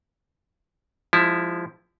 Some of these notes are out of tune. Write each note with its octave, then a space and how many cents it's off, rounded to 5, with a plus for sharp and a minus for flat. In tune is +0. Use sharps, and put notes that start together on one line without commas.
F3 +0 G#3 -25 E4 +0